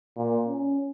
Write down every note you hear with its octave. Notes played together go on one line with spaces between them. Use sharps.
A#2
C#4